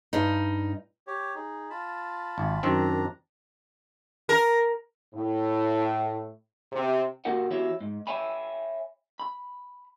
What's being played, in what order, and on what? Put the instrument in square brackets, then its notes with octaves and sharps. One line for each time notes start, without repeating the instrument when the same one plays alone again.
[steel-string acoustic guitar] G2 D#4
[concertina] G4 C#5
D#4 G#4
F4 A5 B5
[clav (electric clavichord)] G#1
[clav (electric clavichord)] F#2 D#3 C4 [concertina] D4 A#5
[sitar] A#4
[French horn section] A2
C3
[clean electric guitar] A#2 A#3 F#4 G4 A#4 F#5
E2 E4 F#4 G4 C#5 E5
G#2
C#5 E5 G5 G#5 B5
B5